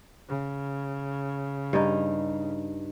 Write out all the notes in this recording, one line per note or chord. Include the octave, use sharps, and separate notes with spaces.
C#3
G2 D#4